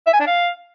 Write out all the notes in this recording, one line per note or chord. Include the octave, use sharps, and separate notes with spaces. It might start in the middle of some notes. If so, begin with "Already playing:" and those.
E5
G#5
D4
F5